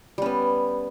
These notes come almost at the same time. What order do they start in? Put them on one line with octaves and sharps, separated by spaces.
G3 C#4 B3